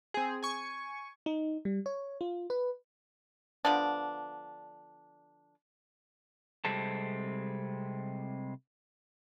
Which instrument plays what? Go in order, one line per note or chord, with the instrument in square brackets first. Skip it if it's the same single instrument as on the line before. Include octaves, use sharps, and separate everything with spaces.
[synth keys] C4 G#4
G#5 C#6
[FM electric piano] D#4
G3
C#5
F4
B4
[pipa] D3 F3 B3 D4
[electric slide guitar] C3 G3 G#3 C4 A4 A5